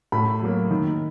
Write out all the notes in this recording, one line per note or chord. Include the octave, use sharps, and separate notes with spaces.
A2 B5
F#3 A#3
D#3